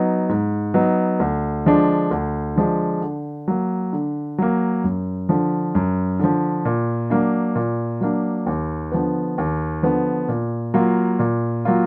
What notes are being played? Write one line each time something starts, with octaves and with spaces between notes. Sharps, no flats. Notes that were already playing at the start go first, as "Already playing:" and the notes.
Already playing: F#3 B3 D#4
G#2
F#3 B3 D#4
D2
D3 F3 G#3 D4
D2
D3 F3 G#3 D4
D3
F#3 A#3
D3
F#3 A#3
F#2
D3 F3
F#2
D3 F3
A#2
F#3 A#3 D4
A#2
F#3 A#3 D4
D#2
D3 F3 B3
D#2
D3 F3 B3
A#2
F#3 A#3 F4
A#2
F#3 A#3 F4